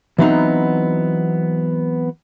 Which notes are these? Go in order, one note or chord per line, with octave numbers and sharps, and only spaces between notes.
E3 F#3 B3 C4 D#4